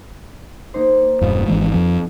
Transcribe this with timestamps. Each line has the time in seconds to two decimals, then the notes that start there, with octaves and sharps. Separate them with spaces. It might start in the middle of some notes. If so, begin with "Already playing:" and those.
0.74 A#3 D#4 C5
1.21 E1 G2 F4 B4 D#5
1.48 G#1 E3 G#3
1.74 F2 F3